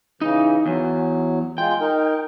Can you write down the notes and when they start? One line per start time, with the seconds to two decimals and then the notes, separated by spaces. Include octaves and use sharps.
0.21 C#3 E3 D#4
0.66 E2 F#3
1.58 G#3 F4 G5
1.81 D#4 A#4